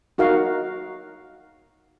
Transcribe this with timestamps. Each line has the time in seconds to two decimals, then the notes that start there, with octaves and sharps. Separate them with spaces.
0.18 D#4 F#4 A#4 F5